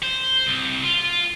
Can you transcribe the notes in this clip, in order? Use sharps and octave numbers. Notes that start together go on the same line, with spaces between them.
C5
C2
F4